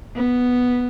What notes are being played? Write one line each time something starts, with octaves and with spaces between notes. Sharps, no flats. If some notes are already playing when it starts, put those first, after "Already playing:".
B3